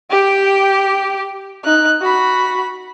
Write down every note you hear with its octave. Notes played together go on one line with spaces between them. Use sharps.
G4 G5
D#4 F#6
F#4 B5